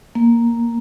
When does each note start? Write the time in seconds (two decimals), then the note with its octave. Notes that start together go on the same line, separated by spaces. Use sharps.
0.15 A#3